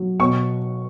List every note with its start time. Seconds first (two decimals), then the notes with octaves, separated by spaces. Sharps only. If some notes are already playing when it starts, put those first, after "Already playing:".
Already playing: F#3
0.20 B2 C#6